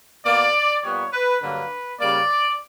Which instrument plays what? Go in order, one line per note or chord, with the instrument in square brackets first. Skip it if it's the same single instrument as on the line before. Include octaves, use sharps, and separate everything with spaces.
[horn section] B2 A#3 D5
A#2 G3 B3 C#5
B4
G2 D3 F#3 A#3 B4
C#3 G3 A#3 D5